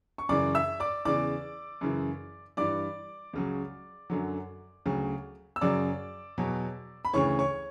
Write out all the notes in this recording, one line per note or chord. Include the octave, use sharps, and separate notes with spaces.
C#6
F#2 C#3 E3 D5 D6
E5 E6
D5 D6
E2 C#3 E3 D5 D6
F#2 C#3 E3
G2 E3 D5 D6
C#2 C#3 F#3
F#2 D3 F#3
D2 C#3 F#3
E6
F#2 C#3 F#3 D5 D6
E2 B2 F#3
B5
D2 C#3 E3 C#5 C#6
C#5 C#6